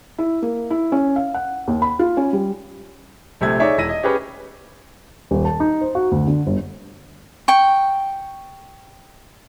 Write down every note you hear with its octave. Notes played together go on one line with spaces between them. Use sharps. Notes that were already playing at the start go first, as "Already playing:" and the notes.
E4
A#3
E4
C#4
F5
F#5
D#2
B5
F4
C#4
G3
A#1 C3 A3 G#6
D#4 G#4 C#5 D5 E5
E1 E4 E5 A#6 D#7
D#5
C#4 G4 G#4 B4 C#5
D#1
A5
D#4
C5
F#4
D2
D3
G1
G5 C#6